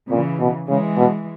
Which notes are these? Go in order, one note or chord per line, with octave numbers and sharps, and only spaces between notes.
A#2 C#3 E3
B2
C#3 E3 G#3
B2